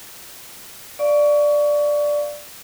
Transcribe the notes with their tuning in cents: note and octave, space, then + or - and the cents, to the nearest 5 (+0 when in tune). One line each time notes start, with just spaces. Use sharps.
D5 +0 F5 +0 C#6 +25